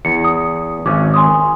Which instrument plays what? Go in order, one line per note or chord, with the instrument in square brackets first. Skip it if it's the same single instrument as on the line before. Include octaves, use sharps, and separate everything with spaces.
[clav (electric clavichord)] E2 [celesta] C#7
[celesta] D#6
[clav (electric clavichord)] G#1 C#4 [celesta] D6
[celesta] G#5 C6 D#6